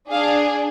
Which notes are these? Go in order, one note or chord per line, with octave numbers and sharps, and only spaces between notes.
D4 G#4 F5